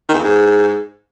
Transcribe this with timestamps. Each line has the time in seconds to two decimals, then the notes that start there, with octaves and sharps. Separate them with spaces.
0.09 D#3
0.14 E2
0.19 F2
0.24 G#2